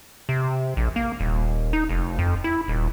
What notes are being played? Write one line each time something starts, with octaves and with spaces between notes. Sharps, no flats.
C3
A#1
A#3
D#1
D#4
F1
F2
E4
D#1